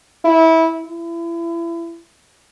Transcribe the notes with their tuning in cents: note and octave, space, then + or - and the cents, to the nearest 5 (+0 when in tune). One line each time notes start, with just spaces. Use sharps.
E4 -20
E4 +30